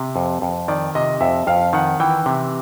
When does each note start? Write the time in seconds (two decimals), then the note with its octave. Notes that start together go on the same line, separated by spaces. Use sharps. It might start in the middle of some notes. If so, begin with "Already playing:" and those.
Already playing: C3
0.16 F2
0.42 F2
0.68 D#3 D5
0.95 C3 D#5
1.21 F2 E5
1.47 F2 F5
1.73 D#3 F#5
2.00 E3 G5
2.26 C3